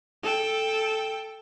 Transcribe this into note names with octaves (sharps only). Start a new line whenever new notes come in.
A4 G5